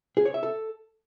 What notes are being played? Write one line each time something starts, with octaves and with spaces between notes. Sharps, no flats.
G#4
C#5
E5
A4